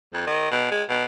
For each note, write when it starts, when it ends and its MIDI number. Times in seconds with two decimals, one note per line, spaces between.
0.13 0.26 41
0.27 0.50 51
0.51 0.68 47
0.71 0.83 56
0.89 1.04 47